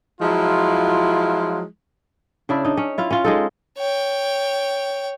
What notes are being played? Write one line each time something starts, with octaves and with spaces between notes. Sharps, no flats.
F3 F#3 G#3 E4 F4
C#3 D4 E4 D5
D4 D#4
C#4
E4 F4 F5
C#4 F4
G#3 D#4 A4
C#5 G5